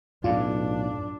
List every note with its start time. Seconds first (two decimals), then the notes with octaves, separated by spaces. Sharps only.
0.24 B1 F#2 A2 D4 F4